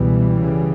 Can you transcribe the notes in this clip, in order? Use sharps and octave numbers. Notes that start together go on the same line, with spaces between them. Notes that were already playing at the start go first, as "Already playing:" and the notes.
Already playing: C#2 B2 E3 G3
C#3